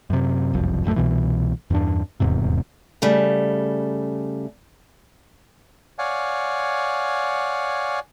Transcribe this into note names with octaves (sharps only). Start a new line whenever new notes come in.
F#2 C3
F#1 C2 F2
D#1 A#1 F#2 A3
C2 B2 E3
E2 G2 D4
D#1 E2 G#2 C3
C#3 G3 A3
C#5 D5 F5 F#5 G#5